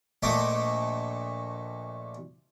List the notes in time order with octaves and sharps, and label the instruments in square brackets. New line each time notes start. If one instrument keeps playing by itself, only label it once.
[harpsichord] A#1 A#2 A3 D#5 D6